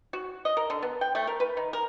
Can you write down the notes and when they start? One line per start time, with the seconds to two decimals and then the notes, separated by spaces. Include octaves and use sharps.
0.13 F#4
0.45 D#5
0.57 A#4
0.70 D3
0.83 B3
1.01 G5
1.15 A3
1.27 A#4
1.40 B4
1.57 D#3
1.73 A#4